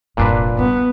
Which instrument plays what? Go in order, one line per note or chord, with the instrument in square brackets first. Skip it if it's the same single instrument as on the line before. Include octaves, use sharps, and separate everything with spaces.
[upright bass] F1 G2 [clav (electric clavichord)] A#2 D4 B4
[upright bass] G2 [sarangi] B3